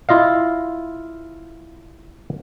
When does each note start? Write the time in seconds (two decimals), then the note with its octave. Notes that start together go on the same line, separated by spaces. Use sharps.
0.09 E4 F4 D#5 F5